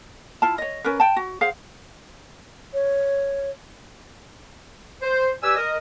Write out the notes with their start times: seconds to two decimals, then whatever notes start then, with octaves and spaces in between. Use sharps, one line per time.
0.42 E4 F4 A5
0.58 C#5 D#5
0.84 C#4 A#4 B4
1.00 G5 A5
1.16 F#4
1.41 G#4 C5 F5 F#5
2.74 C#5
5.01 C5
5.42 G4 B4 D5 G#5 E6
5.56 A#4 D#5